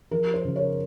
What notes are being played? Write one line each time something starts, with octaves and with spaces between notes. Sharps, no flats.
F3 A#4
C5
C#3
C#5